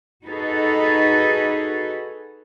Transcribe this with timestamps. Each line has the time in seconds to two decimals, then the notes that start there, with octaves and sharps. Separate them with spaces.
0.26 D#4 F#4 G#4 A4 B4